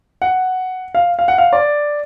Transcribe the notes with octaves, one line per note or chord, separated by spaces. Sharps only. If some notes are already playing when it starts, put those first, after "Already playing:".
F#5
F5
F5
F#5
F5
D5